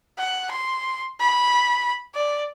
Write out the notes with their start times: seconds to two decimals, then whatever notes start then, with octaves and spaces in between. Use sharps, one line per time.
0.18 F#5
0.51 C6
1.20 B5
2.15 D5